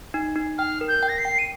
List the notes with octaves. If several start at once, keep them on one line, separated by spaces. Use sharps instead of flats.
D#4
D#4
G5 F6
A#4
G6
G5
A#6
C7
G5
D#7